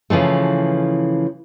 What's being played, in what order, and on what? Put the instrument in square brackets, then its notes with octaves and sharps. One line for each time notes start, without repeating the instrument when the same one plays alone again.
[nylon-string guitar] C#3 E3 F3 A3